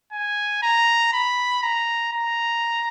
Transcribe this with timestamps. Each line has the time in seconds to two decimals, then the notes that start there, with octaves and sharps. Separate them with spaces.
0.13 G#5
0.63 A#5
1.13 B5
1.63 A#5
2.13 A#5